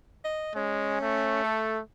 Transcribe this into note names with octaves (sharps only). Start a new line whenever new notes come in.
D#5
G#3 C#4
A3
A4